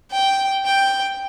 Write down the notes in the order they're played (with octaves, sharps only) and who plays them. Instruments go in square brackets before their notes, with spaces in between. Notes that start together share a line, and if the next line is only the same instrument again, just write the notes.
[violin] G5
G5